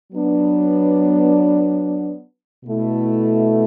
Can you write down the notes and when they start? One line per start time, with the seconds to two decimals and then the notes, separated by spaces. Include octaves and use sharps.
0.12 F#3 B3 D4
2.64 B2 A3 E4